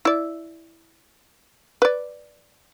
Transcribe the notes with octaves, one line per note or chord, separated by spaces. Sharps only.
E4 D5
B4 D5